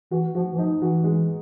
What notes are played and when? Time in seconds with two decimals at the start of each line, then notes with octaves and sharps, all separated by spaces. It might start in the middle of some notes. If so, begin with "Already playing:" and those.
0.11 E3 F#4
0.35 F3 F#4
0.52 E3
0.58 F3 D#4
0.81 E3 F#4
1.04 G#3